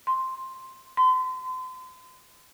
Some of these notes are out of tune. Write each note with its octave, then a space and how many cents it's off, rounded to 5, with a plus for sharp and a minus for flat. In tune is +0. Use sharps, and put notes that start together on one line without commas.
C6 +5
C6 -40